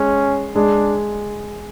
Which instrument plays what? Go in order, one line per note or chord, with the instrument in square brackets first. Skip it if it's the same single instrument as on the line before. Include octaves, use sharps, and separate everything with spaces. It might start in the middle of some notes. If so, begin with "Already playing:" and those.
Already playing: [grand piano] G#3 [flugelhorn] C#4
[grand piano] G#3 [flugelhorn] D4